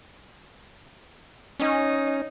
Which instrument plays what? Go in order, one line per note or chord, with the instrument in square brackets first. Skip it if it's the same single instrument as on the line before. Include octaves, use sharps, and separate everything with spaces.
[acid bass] C#4 [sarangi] D#4